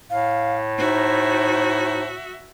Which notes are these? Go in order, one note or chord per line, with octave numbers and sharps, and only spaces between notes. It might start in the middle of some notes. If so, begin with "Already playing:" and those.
A2 F5
D#4 F#4 C5 E5